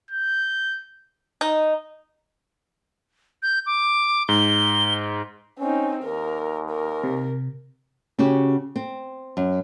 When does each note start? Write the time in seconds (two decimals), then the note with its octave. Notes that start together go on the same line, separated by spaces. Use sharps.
0.11 G6
1.41 D#4
3.43 G6
3.66 D6
4.29 G#2 G7
5.59 C4 C#4 D#4
6.03 D#2 A#4
6.70 A#4
7.04 C3
8.19 C#3 C#4 F#4 G4
8.76 C4
9.37 F#2